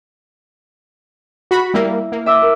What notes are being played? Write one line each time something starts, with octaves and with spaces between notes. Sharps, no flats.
F#4 B5
G3 A#3 E4
A#3
E5 D6 E6
A#4